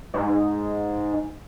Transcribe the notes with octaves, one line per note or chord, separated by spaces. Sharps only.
G#2